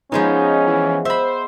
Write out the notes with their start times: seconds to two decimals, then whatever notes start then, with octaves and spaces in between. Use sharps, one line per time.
0.12 F3 G#3 B3 C#4 D#4
0.67 E3
1.05 C5 E5 B5